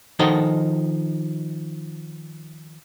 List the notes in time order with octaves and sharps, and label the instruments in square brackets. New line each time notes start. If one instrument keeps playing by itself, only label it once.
[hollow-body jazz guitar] D#3 F3 D#4 F#4 A4 D#5